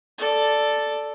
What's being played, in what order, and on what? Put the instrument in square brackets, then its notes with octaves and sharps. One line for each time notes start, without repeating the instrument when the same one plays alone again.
[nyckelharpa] A4 D5